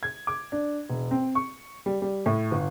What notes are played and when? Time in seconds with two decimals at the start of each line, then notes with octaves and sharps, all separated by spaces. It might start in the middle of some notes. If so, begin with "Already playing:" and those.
0.03 G#6
0.27 D6
0.52 D4
0.89 E1
1.11 C4
1.35 C#6
1.86 G3
2.02 G3
2.26 A2
2.52 G1